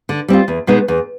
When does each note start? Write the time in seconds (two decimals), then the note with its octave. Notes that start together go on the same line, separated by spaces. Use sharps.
0.09 D3
0.28 G3 C4 F4
0.48 E2
0.67 B2 G#3 B3 D#4
0.88 E2